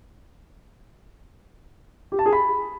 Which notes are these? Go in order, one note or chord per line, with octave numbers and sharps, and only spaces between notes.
G4
A5
G#4
B5